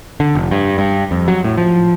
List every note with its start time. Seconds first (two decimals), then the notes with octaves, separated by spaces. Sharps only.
0.20 D3
0.35 F1
0.51 G2
0.78 G2
1.11 F2
1.28 F#3
1.44 A2
1.58 F3